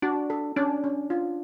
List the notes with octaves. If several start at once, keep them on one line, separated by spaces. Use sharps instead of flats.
D4 F#4
A4
C#4 D4
C#4
F4